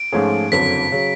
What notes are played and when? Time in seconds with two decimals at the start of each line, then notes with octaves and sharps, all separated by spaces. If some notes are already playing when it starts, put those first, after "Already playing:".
Already playing: D7
0.12 G#2 F3 A3 C#4 G#4
0.52 F#1 F2 D3 F#3 B6
0.91 C#3 F#3